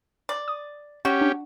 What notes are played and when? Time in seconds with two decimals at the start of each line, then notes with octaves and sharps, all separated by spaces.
0.29 D5
0.48 D#6
1.05 C#4 F#4 G4
1.21 D4